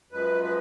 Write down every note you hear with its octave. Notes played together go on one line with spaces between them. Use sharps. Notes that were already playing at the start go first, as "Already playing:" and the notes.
F#2 F3 G#3 B4
B4